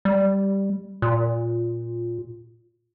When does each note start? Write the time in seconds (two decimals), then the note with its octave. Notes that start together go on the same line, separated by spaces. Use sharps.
0.05 G3
1.02 A#2